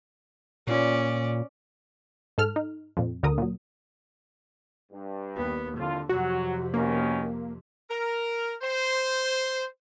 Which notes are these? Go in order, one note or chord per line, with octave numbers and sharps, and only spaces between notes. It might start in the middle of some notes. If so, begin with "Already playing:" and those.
A#2 C#4 D5
G#2 A4 F6
D#4
F2 A#2
D2 D3 A#4 D#6
A#2 F#3
G2
D#2 B3
C2 F2 D3 F4
F2 C3 F#3 F#4
B2 D#3 A#3 C#4
A#4
C5